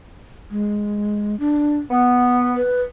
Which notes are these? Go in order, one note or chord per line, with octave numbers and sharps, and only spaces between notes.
G#3
D4
B3 F#5
B4